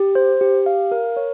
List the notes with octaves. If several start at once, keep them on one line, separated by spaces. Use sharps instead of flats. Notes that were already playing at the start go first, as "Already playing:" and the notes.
Already playing: G4
C5
G4
F5
A#4
C#5